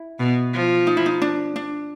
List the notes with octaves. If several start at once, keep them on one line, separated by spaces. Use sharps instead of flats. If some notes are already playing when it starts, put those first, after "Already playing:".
Already playing: E4
B2
F3
D#4
E4
D#4
D4
D4